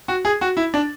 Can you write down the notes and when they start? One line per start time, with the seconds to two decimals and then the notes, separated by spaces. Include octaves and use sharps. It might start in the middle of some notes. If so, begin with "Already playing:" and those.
0.08 F#4
0.25 G#4
0.41 F#4
0.57 E4
0.74 D4